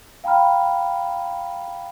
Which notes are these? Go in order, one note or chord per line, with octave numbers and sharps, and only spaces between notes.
F5 G5 A#5 B5 F6